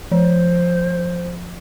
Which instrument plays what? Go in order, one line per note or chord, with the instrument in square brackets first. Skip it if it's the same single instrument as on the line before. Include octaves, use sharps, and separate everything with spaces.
[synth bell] F3 [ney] C5